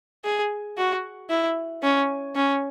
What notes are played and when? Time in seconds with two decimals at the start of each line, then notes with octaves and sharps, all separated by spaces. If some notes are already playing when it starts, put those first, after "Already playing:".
0.25 G#4
0.78 F#4
1.30 E4
1.83 C#4
2.35 C#4